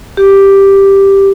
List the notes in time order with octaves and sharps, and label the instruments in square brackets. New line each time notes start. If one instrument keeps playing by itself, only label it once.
[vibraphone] G4